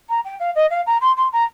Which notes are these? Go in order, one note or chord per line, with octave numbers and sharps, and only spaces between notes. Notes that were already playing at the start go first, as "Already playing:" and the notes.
A#5
G5
F5
D#5
F5
A#5
C6
C6
A#5